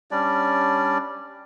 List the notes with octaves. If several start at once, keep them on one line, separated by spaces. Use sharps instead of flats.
G3 C#4 D4 D5